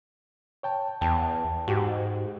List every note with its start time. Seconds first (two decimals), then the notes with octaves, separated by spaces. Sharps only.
0.63 C#5 G5 A5
1.01 E2 G5 A5
1.68 G#2 F#4 G4